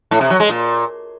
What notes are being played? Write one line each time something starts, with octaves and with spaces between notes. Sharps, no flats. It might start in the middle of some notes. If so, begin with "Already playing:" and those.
A2
C3
F#3
G#3
A#2